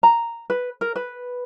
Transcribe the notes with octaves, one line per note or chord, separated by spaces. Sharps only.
A#5
B4
A#4
B4